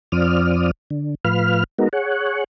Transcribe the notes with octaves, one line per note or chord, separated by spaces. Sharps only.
F2 F3 C4 D5 D#6 F6
D3
A2 F3 B4 F5 F6
G#3 B3 D#4 F#4 A#4
G#4 C#5 F#5